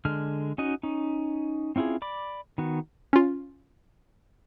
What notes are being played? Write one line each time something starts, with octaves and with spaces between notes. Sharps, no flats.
D3 G#3 F6
C#4 D#4 F#4 D#5
C#4 D#4
C4 C#4 E4 F4 G#4
D5 B5 D6
D#3 B3 F#4
C#4 F4